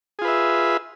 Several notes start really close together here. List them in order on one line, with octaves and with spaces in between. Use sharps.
G#4 F4 B4 E5